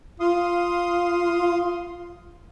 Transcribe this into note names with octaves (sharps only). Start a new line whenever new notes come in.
F4 F5 C6 D#6